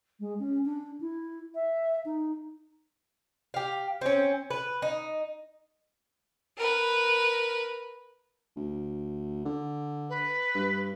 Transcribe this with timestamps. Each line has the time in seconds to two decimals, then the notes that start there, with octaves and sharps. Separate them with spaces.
0.20 G#3
0.39 C#4
0.65 D4
1.01 E4
1.55 E5
2.05 D#4
3.54 G4 F5
4.01 C4 C#4
4.50 B4
4.82 D#4
6.57 A#4 B4
8.56 D2
9.45 D3
10.10 B4
10.54 G2